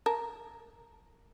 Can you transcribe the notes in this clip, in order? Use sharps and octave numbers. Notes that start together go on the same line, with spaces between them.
A#4 A5